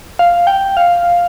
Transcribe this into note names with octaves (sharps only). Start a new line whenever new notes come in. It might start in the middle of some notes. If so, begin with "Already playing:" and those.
F5
G5
F5